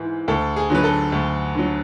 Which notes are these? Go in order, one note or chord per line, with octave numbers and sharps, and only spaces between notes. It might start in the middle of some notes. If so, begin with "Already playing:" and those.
Already playing: G#2 E3
D2 A4
G#4
D3 F#3 B4
A4
D2
D3 F#3